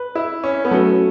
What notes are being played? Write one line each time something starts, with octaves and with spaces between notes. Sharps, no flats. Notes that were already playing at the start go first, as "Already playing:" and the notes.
Already playing: B4
E4
C#4
B3
F#3 A3 C#4 F#4 B4